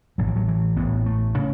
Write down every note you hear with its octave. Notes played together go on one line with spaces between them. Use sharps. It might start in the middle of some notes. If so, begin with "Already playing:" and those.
A1 A2 F#3
E3
F#3
E3
A1 A2 B3
A3
C#3